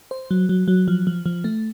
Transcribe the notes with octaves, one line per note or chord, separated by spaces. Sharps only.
C5
F#3
F#3
F#3
F3
F3
F3
A3